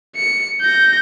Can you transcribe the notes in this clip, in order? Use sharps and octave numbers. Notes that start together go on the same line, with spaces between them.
C#7
G6 A#6